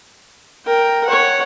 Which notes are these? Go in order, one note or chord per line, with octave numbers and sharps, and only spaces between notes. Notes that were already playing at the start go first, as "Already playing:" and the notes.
A#4 G5
C#5 F#5